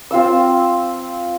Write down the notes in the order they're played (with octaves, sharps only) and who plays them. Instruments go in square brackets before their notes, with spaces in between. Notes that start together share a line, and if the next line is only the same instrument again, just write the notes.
[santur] C4 F4 F5 E6